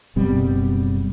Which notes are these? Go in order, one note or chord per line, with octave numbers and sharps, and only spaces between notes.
F#1 B2 G3 C4